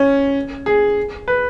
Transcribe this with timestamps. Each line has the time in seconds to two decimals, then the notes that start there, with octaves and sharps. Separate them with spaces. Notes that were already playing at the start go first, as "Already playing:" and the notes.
Already playing: C#4
0.66 G#4
1.28 B4